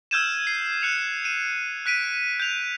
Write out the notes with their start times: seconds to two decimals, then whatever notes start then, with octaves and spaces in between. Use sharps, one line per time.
0.11 E6 F6 G6 G#6 D#7 E7
0.47 C7
0.82 F#6 C#7 F7
1.24 D#7 E7
1.86 F#6 B6 D7 D#7
2.40 G6 F7